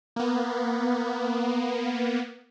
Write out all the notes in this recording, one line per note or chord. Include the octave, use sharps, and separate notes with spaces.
A#3 B3